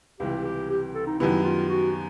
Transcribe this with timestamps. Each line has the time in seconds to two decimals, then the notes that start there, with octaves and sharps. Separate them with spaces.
0.20 C#2 C3 E3 G3 G4
0.45 G4
0.70 G4
0.95 A4
1.07 D#4
1.20 F#2 D#3 G3 B3 E4
1.44 F4
1.69 F#4